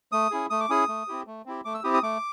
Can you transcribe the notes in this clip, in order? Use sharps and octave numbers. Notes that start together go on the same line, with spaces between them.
A3 D#6
C#4 E4 G#4
A3 D#6
D6
C#4 E4 G#4 D#6
A3
C4 E4 G4
A3
C4 E4 G4
A3 D6
E6
C4 E4 G4 D#6
D#6
A3 D6